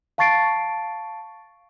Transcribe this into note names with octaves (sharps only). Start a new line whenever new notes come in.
F5 A5 C#6 A6 C7 D7